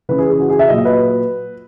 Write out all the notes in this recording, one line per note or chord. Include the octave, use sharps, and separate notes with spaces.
C#3 E3 B4
G#4
G#4
F#4
G#4
E5
A#2 F#3 D#5
B4